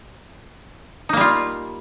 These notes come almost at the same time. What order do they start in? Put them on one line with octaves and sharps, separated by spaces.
D#4 A#3 G3 F4